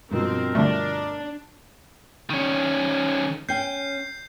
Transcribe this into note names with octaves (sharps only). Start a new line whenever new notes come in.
G2 B2 F3 C4 A#4
D3 G3 A3 D4
D#3 C#4
C#4 G5 G6 C7